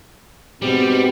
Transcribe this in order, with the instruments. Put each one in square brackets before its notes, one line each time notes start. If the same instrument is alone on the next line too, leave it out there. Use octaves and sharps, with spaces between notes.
[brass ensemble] G#2 B2 C4 [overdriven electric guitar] G3